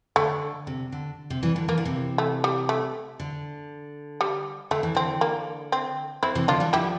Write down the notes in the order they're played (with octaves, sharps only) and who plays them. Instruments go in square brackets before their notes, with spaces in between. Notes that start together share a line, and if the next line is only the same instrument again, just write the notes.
[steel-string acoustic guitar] D3 [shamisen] A3
[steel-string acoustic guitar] C3
D3
C3
E3 G3
D3
[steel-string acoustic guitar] E3 [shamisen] A#3
[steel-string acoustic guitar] D3
C3 E3
[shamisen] A3
G3
A3
[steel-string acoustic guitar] D3
[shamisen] G3
[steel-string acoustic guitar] D3 [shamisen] A3
[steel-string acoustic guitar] E3
[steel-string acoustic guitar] D3 [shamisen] C4
[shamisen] A#3
C4
[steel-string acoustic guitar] D3 [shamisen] C4 E4
[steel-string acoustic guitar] C3 E3
[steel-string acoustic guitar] D3 F3 [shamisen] D4 F4
[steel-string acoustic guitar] E3 G3
[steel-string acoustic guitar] D3 F3 [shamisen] E4 G4